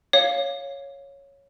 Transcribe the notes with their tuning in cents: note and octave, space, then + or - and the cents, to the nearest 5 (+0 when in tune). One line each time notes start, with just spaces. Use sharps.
C#5 +0 F5 +10